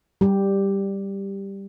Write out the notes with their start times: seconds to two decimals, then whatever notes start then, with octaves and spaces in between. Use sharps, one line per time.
0.21 G3 G4